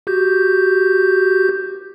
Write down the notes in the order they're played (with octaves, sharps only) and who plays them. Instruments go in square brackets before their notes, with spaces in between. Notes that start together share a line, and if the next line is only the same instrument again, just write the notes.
[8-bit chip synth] F#4 G4 G6